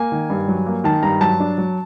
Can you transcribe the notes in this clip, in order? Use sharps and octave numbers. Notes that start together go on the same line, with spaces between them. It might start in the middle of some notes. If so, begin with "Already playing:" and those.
Already playing: A#3 G#5
D#3
G2
F#3
A#3
D#3 A5
G2 A#5
F#3 A5
D4
F#3